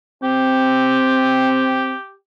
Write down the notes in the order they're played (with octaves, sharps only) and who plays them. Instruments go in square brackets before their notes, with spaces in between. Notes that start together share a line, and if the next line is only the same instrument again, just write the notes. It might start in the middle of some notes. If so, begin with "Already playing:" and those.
[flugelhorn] C4 [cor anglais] G4